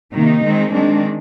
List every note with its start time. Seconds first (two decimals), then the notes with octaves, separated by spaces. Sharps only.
0.15 C3 D#3 A#3 D#4
0.44 D#3 G#3 C4
0.73 D#3 G#3 C4 D4